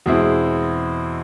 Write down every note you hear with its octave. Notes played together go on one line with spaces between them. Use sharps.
E2 B2 G#3 C4 E4